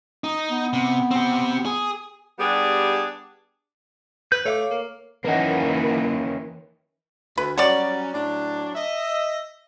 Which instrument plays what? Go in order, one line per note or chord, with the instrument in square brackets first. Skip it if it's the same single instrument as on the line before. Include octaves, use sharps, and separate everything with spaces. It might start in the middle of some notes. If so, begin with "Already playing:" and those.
[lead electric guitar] D#4
[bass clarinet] B3
[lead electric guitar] C3
C4 G4
G#4
[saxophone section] G3 B3 D4 G4 G#4
[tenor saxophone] B4 [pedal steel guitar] G6
[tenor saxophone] A3 [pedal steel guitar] C#5 F5 D6
[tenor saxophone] A#3
[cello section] D#3 E3 [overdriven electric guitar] A#3 C#4 [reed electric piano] B4 F#5
[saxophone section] D2 [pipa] B4
[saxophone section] F#3 G3 C#4 [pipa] F#4 C#5 D5
[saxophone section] A2 F#3 D4
D#5 E5